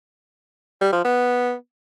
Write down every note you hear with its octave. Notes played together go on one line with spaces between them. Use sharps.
G3
F3
B3